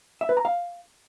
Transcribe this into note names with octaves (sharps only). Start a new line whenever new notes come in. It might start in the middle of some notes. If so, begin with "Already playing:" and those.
E5
B4
A#5
F5